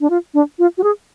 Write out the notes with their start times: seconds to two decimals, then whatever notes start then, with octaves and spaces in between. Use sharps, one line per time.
0.01 D4
0.10 F4
0.34 D4
0.59 F4
0.78 F#4
0.84 G#4